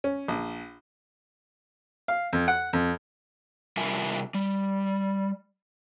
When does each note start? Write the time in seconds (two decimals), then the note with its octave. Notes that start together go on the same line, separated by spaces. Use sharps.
0.04 C#4
0.28 A#1
2.08 F5
2.33 F2
2.48 F#5
2.73 F2
3.77 C3 G3 F4 A#4 E5 G#5
4.34 G3